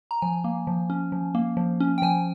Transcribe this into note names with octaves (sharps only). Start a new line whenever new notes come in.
A#5
F3 G#5
A#3
F3
C#4
F3
A#3
F3
C#4
G5
F3 G#5